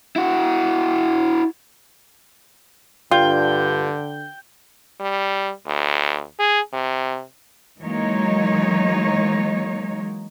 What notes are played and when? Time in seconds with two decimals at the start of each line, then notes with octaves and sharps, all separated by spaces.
0.16 E4 F#4
3.11 G2 D3 F4 G5
5.00 G3
5.66 D2
6.39 G#4
6.73 C3
7.80 E3 F#3 G#3 A#3 D#4 C#5